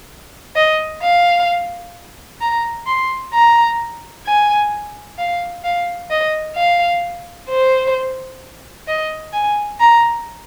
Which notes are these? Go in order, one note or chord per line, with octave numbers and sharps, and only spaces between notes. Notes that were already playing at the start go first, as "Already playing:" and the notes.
D#5
F5
A#5
C6
A#5
G#5
F5
F5
D#5
F5
C5
D#5
G#5
A#5